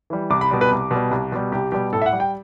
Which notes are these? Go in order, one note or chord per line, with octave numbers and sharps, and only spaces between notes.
E3 G3
C2 D6
B5
B2 G3
B4
C2
B2 G3
C2
B2 G3
C2 G4
B2 G3 G4
A2 A4
E5
F#5
G3
G5